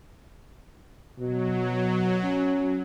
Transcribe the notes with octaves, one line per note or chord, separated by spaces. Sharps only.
B2 F#3
C#4